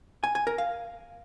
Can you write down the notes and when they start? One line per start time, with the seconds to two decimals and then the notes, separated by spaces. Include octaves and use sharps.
0.24 G#5
0.35 G#5
0.47 A#4
0.58 F5